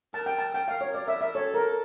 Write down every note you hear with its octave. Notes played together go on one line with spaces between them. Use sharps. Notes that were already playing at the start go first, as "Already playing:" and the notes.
A#4 A5
G5
A5
A#4 G5
F5
C#5
D5
E5
E5
A4 C#5
A#4